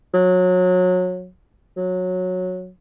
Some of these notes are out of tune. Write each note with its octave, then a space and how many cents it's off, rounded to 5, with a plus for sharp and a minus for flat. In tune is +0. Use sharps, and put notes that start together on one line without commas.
F#3 -25
F#3 -15